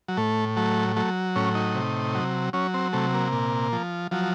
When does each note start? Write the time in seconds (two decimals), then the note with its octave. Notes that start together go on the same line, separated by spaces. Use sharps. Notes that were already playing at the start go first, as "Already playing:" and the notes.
0.08 F#3
0.17 A2 A3
0.57 F#3 A3
0.96 F#3 A3
1.36 A2 C#4
1.55 D#4
1.75 C3
2.15 F#3
2.53 F#3 C#4
2.74 C4
2.93 C3 A3
3.14 A#3
3.32 A#2
3.72 F3
4.11 F3 F#3